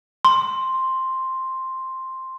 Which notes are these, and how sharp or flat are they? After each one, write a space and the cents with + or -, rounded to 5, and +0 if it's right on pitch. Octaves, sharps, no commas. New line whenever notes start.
C6 +5